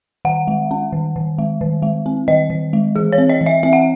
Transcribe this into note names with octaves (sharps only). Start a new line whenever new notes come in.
D#3 F#5
G#3
C#4
D#3
D#3
G#3
D#3
G#3
C4
D#3 D#5
D#3
G#3
E3 G#4
C#5
C4
D#5
E3
E5
C4 E5
F#5